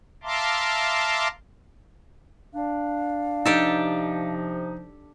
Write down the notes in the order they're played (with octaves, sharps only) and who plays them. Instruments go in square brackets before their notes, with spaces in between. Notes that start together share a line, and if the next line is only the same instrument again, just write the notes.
[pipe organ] E5 F5 A5 A#5 C6 D6
[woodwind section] D4 [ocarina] F5
[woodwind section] C3 F3 [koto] D4 G4 A4 [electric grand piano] D#4